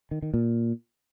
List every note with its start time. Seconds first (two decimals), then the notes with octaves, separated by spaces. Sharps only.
0.11 D#3
0.22 D#3
0.34 A#2